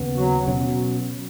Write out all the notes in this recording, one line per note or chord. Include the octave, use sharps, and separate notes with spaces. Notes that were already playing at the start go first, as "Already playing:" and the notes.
Already playing: D#2 C#3 B3
F#3
B2 F#3 C#4